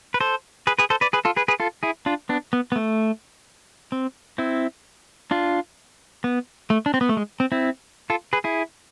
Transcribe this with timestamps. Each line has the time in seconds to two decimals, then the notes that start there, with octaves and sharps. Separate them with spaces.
0.14 B4
0.20 A4 C5
0.67 G#4 B4
0.79 G#4 B4
0.90 A4 C5
1.01 B4 D5
1.13 G#4 B4
1.25 F4 A4
1.36 G#4 B4
1.48 G#4 B4
1.60 F4 A4
1.83 E4 G#4
2.06 D4 F4
2.29 B3 D4
2.53 B3
2.72 B3
2.76 A3
3.92 C4
4.38 C4 E4
5.31 D4 F4
6.24 B3
6.70 A3
6.86 D4
6.94 C4
7.01 B3
7.09 A3
7.17 G#3
7.40 C4
7.52 C4 E4
8.10 F4 A4
8.33 G#4 B4
8.44 E4 G#4